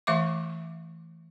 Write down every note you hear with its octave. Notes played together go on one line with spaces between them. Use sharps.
E3 A3 E5 C#6 D6